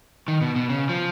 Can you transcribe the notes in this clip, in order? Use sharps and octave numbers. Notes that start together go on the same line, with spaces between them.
D#3
B2
B2
C#3
F3